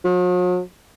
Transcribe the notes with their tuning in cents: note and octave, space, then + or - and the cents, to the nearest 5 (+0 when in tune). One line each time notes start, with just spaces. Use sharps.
F#3 -45